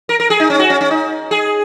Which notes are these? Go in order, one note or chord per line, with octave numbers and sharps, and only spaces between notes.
A#4
A#4
G#4
D#4
C#4
F#4
C#4
C#4
D#4
G#4